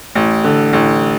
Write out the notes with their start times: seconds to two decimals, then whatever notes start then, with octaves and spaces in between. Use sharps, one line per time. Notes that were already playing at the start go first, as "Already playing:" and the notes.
0.15 A1
0.44 D3
0.73 A1